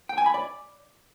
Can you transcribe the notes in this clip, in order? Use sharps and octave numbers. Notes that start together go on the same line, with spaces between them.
G5
G#5
B5
D5